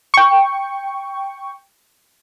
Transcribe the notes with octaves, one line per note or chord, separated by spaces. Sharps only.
G5 C#6